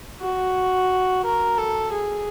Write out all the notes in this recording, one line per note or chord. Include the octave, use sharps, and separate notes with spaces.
F#4
A#4
A4
G#4